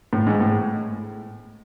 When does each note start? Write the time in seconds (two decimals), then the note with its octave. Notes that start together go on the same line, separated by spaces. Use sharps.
0.13 A2
0.27 G#2
0.41 A2